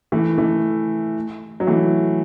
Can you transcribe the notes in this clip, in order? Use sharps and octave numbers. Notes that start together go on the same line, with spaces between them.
E3 A3
E3 A3
F#3
E3 A3